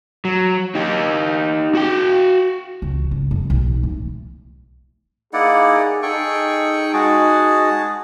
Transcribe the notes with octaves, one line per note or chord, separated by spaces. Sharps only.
F#3
D#4 G4
F#4 G5
C#2
C#2
F#2
B1
A2
A#3 D#4 E4 G#4 D5 F#5
D#4 G#4 A4 G5 C#6
G#3 F#4 G#4 A5